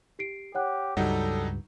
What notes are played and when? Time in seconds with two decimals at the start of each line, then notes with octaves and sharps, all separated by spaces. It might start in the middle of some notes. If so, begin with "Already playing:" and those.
0.19 G4 C7 D7
0.55 G4 C#5 F#5 F#6
0.97 C#2 G2 F#3 G3 D#4 A4 F#5